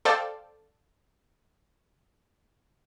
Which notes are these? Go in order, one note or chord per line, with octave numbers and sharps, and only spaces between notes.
A4 C5 D5 F5 G5